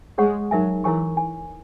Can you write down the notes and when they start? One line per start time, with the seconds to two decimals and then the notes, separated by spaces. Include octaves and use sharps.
0.18 G#3 G#4 C#5 F#5 C#6
0.51 F#3 D#4 A#4 E5 G#5
0.84 E3 E4 A#4 C#5 G#5 C#6
1.17 G#5